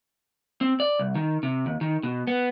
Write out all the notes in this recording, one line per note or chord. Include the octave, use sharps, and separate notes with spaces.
C4
D5
C2
D#3
C3
D#2
D#3
B2
B3